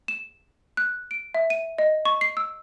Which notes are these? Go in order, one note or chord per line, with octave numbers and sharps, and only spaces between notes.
E7
F#6
D7
E5
D#7
D#5
C#6
C7
E6